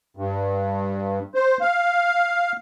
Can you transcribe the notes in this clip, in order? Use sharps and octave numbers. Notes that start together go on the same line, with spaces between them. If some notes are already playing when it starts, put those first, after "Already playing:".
G2
C5
F5